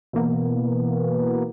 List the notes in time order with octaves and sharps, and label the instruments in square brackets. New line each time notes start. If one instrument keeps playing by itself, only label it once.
[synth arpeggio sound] B2 E3 A#3 B3